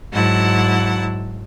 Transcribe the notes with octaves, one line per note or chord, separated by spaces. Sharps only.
G#2 F#3 E4 F#5 A5